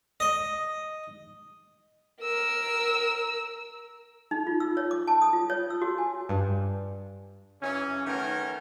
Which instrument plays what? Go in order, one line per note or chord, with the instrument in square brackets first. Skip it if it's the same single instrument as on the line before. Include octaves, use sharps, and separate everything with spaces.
[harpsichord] D#5
[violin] A#4 E6
[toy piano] D#4
F4
E6
C#5
D6
A5
D#6
F4
C#5
E6
F#4
G#5
[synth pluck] G2
[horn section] F#2 C#3 E3 C#4
D#3 A3 B3 C#4 D#4 A#4